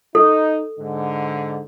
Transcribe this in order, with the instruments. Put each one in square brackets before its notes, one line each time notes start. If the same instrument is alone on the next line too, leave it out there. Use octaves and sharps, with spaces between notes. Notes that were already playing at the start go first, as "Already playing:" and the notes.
[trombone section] D#4 [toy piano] A4
[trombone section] G#2 D3